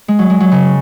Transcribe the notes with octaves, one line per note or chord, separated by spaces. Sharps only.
G#3
F#3
G#3
F#3
C#3